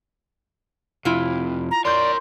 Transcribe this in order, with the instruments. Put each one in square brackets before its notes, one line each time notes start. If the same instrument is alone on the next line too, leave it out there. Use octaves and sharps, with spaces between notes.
[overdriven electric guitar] F2 C3 [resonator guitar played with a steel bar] E4 F4
[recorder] A#5
[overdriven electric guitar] A#4 C#5 [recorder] D5 [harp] C6 G6